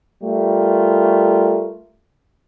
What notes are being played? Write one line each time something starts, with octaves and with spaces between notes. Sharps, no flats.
G3 A3 F4 A#4